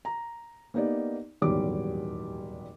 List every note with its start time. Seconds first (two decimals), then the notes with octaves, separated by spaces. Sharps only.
0.05 A#5
0.74 A#3 B3 D#4 G4 D5
1.41 D#1 E2 G#2 F#3 G3 D6